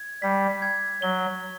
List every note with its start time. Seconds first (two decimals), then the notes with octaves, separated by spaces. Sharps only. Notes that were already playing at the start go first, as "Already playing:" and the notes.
Already playing: G#6
0.22 G3 B6
0.62 G#6
1.02 F#3 G7